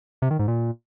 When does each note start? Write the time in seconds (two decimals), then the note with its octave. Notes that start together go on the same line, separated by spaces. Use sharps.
0.22 C3
0.31 D#3
0.39 G#2
0.48 A#2